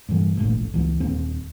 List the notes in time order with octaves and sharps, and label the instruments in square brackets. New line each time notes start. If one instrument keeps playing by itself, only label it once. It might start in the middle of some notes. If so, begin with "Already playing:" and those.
[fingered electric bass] G2 E3
E1 A#1 A2
C#2 E3
D#1 D#2 C4